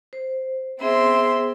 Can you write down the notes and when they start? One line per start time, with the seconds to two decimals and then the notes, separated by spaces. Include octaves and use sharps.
0.13 C5
0.81 B3 C4 G#4 E5 C6